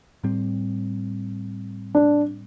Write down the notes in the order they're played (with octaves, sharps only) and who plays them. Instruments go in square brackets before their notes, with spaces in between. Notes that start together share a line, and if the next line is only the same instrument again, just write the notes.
[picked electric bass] A2 G3 C4
[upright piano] D4